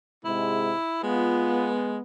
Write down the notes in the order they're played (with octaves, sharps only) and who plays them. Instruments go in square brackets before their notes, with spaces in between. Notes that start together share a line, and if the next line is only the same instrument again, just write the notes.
[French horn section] G#2 C3 G#3 [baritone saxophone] E4
[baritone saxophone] G#3 [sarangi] B3 [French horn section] F4